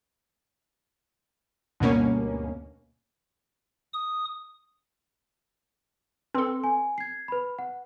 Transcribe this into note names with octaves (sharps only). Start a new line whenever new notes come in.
D2 G2 B2 A#3 C#4
D#6
C4 A4 B4 C6
G#5
G#6 C7
B4 B5
F#5